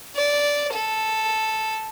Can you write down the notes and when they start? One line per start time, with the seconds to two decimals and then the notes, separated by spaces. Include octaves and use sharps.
0.17 D5
0.73 A4